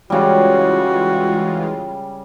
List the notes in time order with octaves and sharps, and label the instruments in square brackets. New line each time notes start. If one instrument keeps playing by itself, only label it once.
[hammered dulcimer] C#3 G3 [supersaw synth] E3 G#3 F4 [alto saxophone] F#4